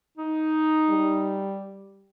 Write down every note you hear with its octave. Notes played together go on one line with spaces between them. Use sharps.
D#4
G3